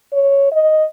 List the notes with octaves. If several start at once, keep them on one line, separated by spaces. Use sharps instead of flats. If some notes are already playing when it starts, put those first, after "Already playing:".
C#5
D#5